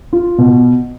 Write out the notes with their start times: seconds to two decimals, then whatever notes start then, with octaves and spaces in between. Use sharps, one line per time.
0.13 F4
0.38 B2